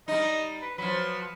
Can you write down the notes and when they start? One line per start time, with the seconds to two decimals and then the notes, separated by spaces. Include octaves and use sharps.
0.08 G3 D#4 D#5
0.62 B4
0.78 F3 F#3 B4